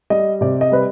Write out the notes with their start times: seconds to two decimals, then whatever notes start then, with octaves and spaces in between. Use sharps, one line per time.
0.10 G3 D#5
0.41 C3 D5
0.61 D#5
0.72 G3 B4